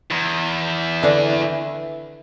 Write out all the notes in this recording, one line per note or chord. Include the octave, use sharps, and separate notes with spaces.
E2
D3 E3 D4